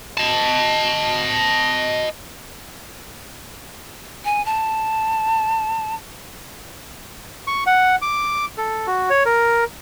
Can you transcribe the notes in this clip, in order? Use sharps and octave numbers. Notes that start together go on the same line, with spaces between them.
D#5 A5
G#5
A5
C#6
F#5
D6
A4
F#4
C#5
A#4